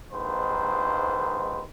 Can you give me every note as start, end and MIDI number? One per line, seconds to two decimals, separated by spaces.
0.12 1.62 34
0.12 1.62 39
0.12 1.62 44
0.12 1.62 71
0.12 1.62 72